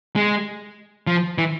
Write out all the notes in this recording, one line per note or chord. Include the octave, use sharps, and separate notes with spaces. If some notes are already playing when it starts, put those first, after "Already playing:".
G#3
F3
E3